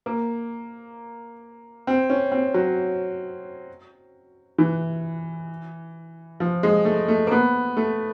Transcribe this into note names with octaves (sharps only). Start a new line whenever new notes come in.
A#3
C4
C#4
C4
F#3
E3
F3
G#3
A3
A3
A#3
B3
A3